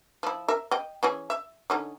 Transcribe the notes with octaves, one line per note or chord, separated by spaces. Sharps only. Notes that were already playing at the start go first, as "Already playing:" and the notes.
F3 E4
A#4 E5
D#5 G5
E3 C#4 G#4
E5
D3 C#4 D#4